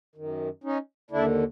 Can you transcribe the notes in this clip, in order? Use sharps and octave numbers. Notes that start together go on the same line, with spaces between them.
F#2 D#3
C#4 D#4
D#2 D3 D4 E4